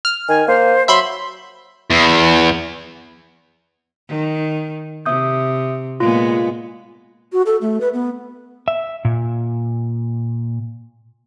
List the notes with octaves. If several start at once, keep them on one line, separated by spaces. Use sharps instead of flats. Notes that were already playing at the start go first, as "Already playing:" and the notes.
F6
D#3 G#5
A#3 C5
F#3 E5 B5 C6
E2
D#3
C3 E5 D#6 G6
A#2 G#3 B3 F4
F#4
A4
A3
B4
B3
E5
A#2